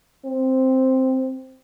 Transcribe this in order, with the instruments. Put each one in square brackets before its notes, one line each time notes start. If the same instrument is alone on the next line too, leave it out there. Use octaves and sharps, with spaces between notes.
[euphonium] C4